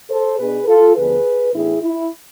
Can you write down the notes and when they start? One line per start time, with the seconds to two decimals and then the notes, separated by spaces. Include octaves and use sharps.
0.10 A4 C5
0.38 B2 B3 D4 G#4 B4
0.67 F4 A4
0.96 D2 D3 F3 B3 G#4 B4
1.53 A2 E3 B3 D4 E4 G#4
1.81 E4